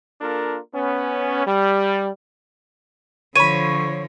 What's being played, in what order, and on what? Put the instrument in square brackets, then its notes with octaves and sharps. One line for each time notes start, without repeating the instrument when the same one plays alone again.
[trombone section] A#3 D4 F4 A4 A#4
B3 C#4
G3
[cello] D3 F3 [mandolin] C#5 B5 [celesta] D#7